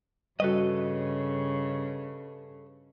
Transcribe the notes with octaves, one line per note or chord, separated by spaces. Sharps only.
G2 C#3 G3 F#4 A4 B4 D#5